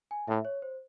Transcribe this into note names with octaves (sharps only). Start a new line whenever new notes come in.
G#5
A2 E5
C#5
C5